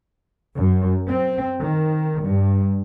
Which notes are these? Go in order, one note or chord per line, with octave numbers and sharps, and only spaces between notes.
F#2
C4
D#3
G2